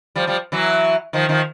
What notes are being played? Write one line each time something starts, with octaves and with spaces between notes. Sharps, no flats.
F3 G3
F3 G3
E3 F#3
D#3 F3
D#3 F3